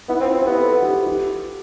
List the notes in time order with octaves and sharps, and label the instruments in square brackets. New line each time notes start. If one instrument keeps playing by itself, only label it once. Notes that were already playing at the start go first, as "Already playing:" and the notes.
[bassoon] B3 [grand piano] E4
[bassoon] C4
[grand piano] F4
[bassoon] C4
[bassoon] B3 [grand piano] G4
[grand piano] A4
G4
G4